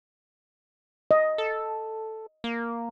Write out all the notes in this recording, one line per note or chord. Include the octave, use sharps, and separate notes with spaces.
D#5
A4
A#3